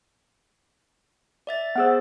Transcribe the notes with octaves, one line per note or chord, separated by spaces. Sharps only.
D5 E5 A6
B3 G#4 C5 F#5 E6